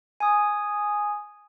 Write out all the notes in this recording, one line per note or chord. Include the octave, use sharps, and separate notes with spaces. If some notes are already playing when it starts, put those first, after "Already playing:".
G#5 D#6